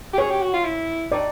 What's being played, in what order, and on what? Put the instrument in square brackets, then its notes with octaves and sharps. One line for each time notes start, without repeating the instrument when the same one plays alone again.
[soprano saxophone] G4
[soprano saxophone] G#4 [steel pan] C#5
[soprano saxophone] G4
F#4
F4
E4
[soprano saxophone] D#4 [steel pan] D5